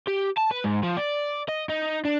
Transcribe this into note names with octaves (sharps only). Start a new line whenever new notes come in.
G4
A5
B4
G#2
F3
D5
D#5
D#4
D4